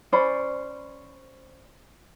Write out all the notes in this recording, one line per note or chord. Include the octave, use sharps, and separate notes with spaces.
C#4 C5 D5 B5